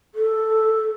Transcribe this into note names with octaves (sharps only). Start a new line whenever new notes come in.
A4